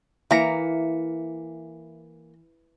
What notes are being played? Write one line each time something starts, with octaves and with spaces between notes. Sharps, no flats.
E3 A#3 E5 A#5 B6 C#7